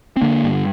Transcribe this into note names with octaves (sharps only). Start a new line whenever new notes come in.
C4
D3 A#3 D4
G2